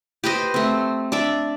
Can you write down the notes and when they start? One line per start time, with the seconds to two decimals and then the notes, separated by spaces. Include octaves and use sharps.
0.24 G4 B4 C5 D#5
0.54 A3 C4
1.12 D4 D5 E5